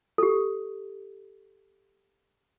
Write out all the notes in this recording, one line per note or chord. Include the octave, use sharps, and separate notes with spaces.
G4 A4